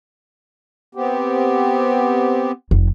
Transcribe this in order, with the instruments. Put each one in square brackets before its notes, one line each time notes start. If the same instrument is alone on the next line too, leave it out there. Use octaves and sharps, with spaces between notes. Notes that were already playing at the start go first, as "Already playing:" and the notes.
[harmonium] B3 C4 G4
[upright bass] F1